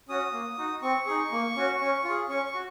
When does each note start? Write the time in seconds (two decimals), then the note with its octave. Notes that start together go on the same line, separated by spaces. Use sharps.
0.09 C#4 F#4 D#6
0.33 A#3
0.58 D#4 F#4
0.82 C4 C#6
1.06 D#4 G#4
1.32 A#3
1.56 C#4 F#4
1.81 C#4
2.04 F4
2.10 G#4
2.29 C#4 C#6
2.46 C#6
2.54 F#4